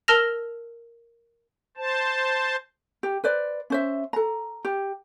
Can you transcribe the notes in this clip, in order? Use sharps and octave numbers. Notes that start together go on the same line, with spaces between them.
A#4 A5 E6 F6 A#6 F7
C5 A5
G4
B4 C5 D5
C#4 C5 E5
A4 A#5
G4